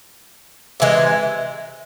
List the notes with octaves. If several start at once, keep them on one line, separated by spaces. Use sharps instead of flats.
C3 E3 G#3